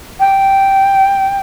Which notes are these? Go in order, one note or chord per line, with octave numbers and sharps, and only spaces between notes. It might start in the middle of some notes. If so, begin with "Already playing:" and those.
G5